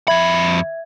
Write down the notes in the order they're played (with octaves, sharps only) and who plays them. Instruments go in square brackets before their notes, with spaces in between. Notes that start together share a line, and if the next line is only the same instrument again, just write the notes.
[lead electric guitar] F2 B5 [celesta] E5 G#6